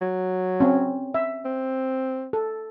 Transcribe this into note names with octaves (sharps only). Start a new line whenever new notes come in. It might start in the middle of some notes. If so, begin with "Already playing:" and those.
F#3
C4 C#4
E5
C4
A4